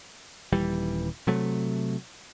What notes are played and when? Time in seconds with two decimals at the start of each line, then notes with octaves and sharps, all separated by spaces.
0.53 D#1 E3 G3
1.27 C3 F#3 A3